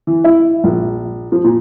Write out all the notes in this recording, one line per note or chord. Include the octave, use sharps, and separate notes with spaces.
E3
E4
A#1
F3
A#2